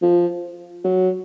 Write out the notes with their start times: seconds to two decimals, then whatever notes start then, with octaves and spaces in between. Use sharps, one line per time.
0.02 F3
0.84 F#3